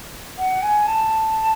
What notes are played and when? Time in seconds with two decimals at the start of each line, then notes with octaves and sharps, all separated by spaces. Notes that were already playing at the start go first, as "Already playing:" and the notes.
0.37 F#5
0.61 G#5
0.86 A5